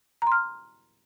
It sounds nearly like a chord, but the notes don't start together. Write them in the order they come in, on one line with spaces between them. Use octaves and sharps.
A#5 C6 F6